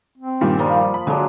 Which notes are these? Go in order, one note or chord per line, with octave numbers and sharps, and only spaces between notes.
C4
G2 A#2 D#3
F3 G3 A#3 F4
B5
D3 F#3 G#3 D4